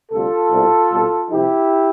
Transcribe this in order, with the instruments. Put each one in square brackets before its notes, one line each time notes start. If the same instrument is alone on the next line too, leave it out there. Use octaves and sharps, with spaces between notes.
[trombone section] D2 C3 G3 F4 A4
C2 B2 G3
C2 B2 G3
C2 C3 F3 E4 G4